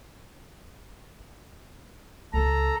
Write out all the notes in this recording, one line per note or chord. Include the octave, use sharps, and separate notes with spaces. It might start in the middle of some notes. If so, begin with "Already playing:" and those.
C#2 C#3 A4 A#5